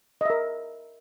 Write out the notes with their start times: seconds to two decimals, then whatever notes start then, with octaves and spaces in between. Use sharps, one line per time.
0.21 D#5
0.25 E5
0.30 A#4